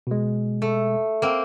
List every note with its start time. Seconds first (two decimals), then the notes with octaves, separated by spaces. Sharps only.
0.07 B2 G#3
0.62 A3
1.22 A#3 C4